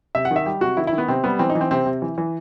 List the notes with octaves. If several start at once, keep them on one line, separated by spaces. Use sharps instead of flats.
C3 E5
F#5
D#3
E5
G3 G4
C3 F#4
D#3 E4
E4
D#3
B3
C3 C4
G3 B3
E3 C4
D#4
E3
C4
C3 C4
C3
E3
E3